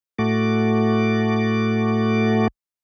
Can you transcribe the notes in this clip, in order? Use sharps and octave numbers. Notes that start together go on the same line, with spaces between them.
A2 A3 F#4 D6